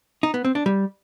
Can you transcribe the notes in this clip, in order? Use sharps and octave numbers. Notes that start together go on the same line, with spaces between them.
D#4
B3
C4
D4
G3